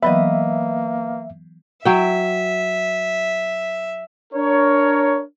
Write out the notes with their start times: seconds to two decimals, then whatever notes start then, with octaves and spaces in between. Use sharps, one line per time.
0.03 E3 F#3 A#3 B3 B4 D#5 E5
1.85 F#3 E5 G5
4.33 D4 A#4 C#5